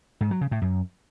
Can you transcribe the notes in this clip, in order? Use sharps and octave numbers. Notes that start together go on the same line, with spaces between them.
G#2
F#3
C#3
A2
F#2